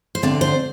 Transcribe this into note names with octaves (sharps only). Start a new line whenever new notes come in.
C5
D2 D3 A3 C4 D5
C5